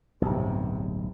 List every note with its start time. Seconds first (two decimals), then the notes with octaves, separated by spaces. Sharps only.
0.22 D1 B1 G2 C3